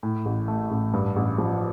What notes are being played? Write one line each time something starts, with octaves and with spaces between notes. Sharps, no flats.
A2
A1
A3
A1
G2
A1
F3